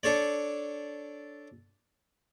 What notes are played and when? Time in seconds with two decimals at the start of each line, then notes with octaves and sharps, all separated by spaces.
0.03 D4 A4 C#5 D5